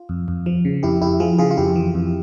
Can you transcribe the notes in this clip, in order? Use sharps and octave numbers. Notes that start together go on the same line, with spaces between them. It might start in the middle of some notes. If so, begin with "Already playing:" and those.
Already playing: F4
F2
F2
F3
C#3
F2 E4 G4
F2 E4 G4
F3 F4 G#4
C#3 F4 G#4
F4
F2 E4 G4
E3
F2